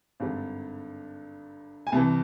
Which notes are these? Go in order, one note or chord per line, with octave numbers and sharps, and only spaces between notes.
G#1 G2 D3
G#5
C2 C3 E3 A5